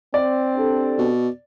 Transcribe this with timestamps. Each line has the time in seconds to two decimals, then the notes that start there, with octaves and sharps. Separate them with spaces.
0.14 C4 D5
0.56 D4 G4 A4
0.98 B2